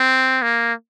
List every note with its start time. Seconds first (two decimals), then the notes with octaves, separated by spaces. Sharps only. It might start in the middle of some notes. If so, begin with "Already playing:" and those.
Already playing: C4
0.42 A#3